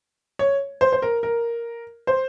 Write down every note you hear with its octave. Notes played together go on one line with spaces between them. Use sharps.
C#5
C5
C5
A#4
A#4
C5